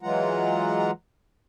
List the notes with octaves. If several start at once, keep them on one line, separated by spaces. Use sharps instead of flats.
E3 F#3 G#3 F4 F#5 A#5